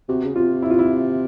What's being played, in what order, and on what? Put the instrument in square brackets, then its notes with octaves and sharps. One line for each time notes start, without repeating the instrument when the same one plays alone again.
[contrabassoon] C3 [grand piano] F#4
[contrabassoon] C#3
[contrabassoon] C3 [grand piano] F4
[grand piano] E4
F4
E4